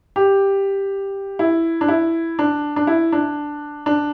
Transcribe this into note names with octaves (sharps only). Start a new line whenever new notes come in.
G4
E4
D4
E4
D4
D4
E4
D4
D4